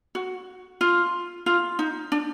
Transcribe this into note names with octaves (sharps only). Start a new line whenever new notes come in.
F#4
F4
F4
D#4
D4